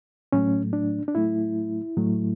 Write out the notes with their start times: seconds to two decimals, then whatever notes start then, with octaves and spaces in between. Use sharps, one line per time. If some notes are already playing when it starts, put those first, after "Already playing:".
0.32 A2 F#3 A3 C#4
0.73 D4
1.08 D4
1.15 A2 F#3 A3 E4
1.97 A2 F#3 A3